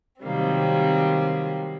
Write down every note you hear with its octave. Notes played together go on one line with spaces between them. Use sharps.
C3 D#3 F#3 G3 A#3 C4